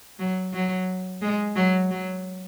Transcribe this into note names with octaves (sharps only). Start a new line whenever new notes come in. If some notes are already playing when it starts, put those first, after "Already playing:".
F#3
F#3
G#3
F#3
F#3